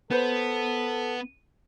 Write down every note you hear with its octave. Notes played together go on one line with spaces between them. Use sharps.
B3 A4 B4 C5